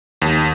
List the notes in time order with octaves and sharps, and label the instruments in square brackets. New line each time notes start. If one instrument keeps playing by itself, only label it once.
[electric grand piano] D#2